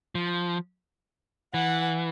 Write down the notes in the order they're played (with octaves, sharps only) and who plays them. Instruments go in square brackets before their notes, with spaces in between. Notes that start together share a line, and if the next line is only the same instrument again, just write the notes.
[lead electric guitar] F3
[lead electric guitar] E3 [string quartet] F#5